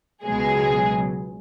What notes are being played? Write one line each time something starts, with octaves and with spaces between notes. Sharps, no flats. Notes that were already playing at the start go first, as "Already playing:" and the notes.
C#2 B2 F#3 G#3 G#4